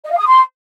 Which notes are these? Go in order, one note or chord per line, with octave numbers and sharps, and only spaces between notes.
D#5
F5
D#6
C6